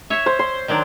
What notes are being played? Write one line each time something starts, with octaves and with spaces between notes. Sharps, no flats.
C#5 E5
C5
C6
D#3 F#3 D4